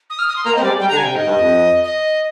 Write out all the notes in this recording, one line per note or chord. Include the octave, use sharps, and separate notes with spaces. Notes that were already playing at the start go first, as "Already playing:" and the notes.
D#6
F6
D#6
C6
A#3 A#5
C4 D#5
G3 D5
G#3
G3 G5
D3 A#5
G#5
C3
G5
G#2 D#5
G2
F2
D#5